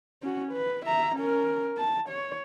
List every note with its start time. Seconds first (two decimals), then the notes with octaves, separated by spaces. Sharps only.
0.23 C#4 F#4
0.52 B4
0.86 E5 A#5
1.16 C#4 A#4
1.77 A5
2.09 C#5